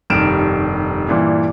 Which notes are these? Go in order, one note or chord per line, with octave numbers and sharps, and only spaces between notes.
F1 G2 D#3 F6 D7 E7
G2 A#2 E3 G3